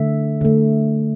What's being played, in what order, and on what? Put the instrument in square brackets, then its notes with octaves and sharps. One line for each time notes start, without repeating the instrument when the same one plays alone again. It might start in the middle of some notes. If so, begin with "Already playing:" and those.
Already playing: [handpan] D3 A3 E5
D3 A3